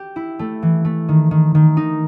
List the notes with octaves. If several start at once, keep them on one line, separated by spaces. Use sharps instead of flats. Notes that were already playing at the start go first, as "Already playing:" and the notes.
Already playing: G4
E4
A3
E3
A3
D#3
D#3
D#3
D#4